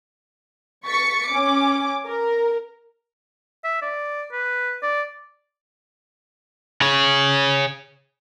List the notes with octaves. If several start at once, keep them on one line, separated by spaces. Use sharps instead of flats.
C#6 A6 B6 C#7
C#4 D6
A#4
E5
D5
B4
D5
G#4 C#5